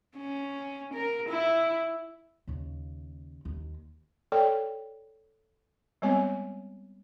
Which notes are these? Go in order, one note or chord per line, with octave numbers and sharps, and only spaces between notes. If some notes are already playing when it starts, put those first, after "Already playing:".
C#4
A#4
E4
D#2 C#3
D#2
A4 C#5 D5 G5
G3 G#3 B3 C4 C#5 G#5